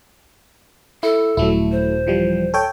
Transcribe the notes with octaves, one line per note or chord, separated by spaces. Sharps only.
E4 A4
D#1 F#3 A3 E4
C5
E3 F3 G3
A4 C#5 G5